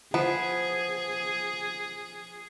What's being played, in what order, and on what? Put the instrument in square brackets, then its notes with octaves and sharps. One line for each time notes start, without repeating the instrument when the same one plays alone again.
[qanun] F3 [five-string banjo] B3 [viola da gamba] G#4